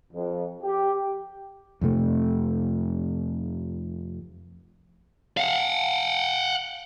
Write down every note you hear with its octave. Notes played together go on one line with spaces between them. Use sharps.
F2
G4
F2 C3 A3
F5 F#5